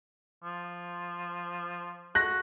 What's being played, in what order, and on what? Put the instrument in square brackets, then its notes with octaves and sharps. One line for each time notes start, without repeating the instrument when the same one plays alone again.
[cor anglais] F3
[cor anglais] F#4 [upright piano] F#6 A#6